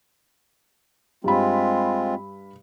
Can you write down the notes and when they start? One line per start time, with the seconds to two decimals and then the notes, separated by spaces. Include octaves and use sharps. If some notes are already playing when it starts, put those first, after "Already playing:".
1.24 G2 G#3 C4 F4 B5